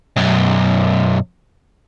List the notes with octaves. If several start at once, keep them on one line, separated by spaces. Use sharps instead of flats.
B1 F#2